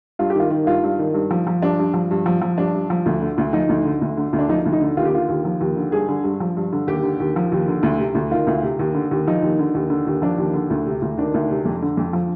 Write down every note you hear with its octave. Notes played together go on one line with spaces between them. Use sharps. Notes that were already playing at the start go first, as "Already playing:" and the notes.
G2 F4
G4
D#3 F4
D#3
G2 F4
G2
D#3
G2
F3
F3
G2 D4
G2
F3
G2
F3
F3
G2 D4
G2
F3
D2
D3
D2
F3 D#4
D2
D3
D2
D3
D2
D4
F3 D#4
D2
D#4
D3
D#2 F4
G4
D3 F4
D#2
F3
D#2
D3
G2 G#4
D3
G2
F3
G2
D3
D#2 G4
D3
D#2
F3
D#2
D3
D2
C3
D2
D#3 F4
D2
C3
D#2
D3
D#2
F3 D#4
D#2
D3
D#2
D3
D#2
F3 D4
D#2
D3
D2
C3
D2
D#3 D4
D2
C3
F2
D3
F2
F3